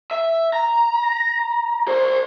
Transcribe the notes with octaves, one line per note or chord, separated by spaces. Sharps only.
E5
A#5
C5 D5